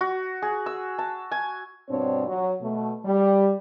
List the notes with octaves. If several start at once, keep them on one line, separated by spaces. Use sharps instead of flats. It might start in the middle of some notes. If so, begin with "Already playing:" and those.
F#4
G#4
E6
A5
G#5
G2 B2 C4 D4 C#5
F#3
B2 A3
G3